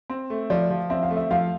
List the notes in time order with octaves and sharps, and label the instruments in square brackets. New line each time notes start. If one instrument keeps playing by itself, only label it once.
[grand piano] C4
A3
[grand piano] F3 [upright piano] D5
[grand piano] F3
[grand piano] C4 [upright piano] E5
[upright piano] F5
[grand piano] A3
[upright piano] E5
[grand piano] F3 [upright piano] F5